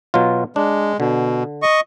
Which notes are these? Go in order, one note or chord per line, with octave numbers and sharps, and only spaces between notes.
B2 F#3 F4
G#3 D4
B2 D3
D#5 C#6